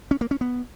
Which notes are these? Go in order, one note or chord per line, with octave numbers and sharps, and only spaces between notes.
C#4
A#3
C#4
B3